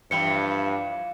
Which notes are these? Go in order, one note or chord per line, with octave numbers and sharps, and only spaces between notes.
G2 E3 F3 F4 E5 G5 B5 C#7